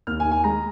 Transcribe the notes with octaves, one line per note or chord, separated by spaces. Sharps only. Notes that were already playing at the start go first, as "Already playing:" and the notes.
D#2 F6
G#5
D#3
G#5
G#3 A#5